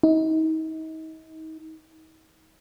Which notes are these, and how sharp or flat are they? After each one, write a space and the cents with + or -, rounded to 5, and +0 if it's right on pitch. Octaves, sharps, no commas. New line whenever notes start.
D#4 +35